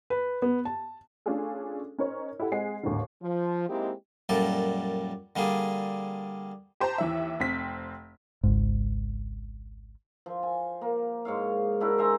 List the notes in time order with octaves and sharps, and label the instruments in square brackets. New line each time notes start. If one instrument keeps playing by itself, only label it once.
[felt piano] B4
B3
A5
[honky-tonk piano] A3 C#4 D4 F4 G#4 A4
C#4 D#4 A#4 C5 C#5
E4 G4 A4 F#5
G#3 C4 G#4 F#5 C7
A1 D#2 G#2 D3
[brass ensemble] F3
G#3 A#3 C4 D#4 E4 G4
[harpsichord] F#2 A#2 G3 A4 D5
D3 G3 A#3 G#4
[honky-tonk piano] G4 C5 A5 A#5
D#2 E3 E5
F1 C4 B6
[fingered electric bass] G#1 C#2 G#2
[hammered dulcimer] F3
G#5
A#3
G#2 C#5 F5
D4 E4 F#4 A#4
C5 E5 G#5 A#5